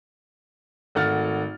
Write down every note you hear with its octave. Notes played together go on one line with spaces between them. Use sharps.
G#1 A3 F#5 F6 A6